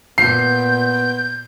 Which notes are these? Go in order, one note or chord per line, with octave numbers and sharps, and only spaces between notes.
A#2 B3 G6 C7